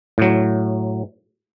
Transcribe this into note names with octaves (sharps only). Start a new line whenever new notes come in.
A2 F#3